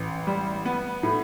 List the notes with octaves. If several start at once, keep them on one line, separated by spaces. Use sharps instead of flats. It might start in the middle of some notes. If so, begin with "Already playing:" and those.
Already playing: A1
G3
B3
A2